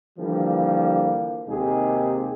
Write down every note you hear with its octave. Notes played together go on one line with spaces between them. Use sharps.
D3 E3 F3 G3 A#3
D#2 C3 G#3 D#4 G4 G#4